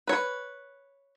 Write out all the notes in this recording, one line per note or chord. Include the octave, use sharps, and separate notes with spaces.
B4 C#5